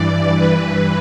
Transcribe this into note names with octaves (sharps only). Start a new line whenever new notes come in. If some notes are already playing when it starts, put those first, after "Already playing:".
Already playing: G2 E3 D5
G2 E3 B4